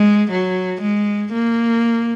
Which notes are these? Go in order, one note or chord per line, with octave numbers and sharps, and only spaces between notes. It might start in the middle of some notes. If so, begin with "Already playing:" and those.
Already playing: G#3
F#3
G#3
A#3